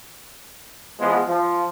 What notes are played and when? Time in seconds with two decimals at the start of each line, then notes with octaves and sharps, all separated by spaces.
0.99 E2 F3 G#3 B3
1.28 F3